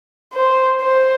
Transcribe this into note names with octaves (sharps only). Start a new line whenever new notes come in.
C5
C5